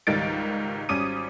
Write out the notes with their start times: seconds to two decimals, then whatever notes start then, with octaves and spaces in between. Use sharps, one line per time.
0.07 C#2 G#2 D#3 G3 A6 D7
0.89 G#1 G3 C#4 D6 D#6 D#7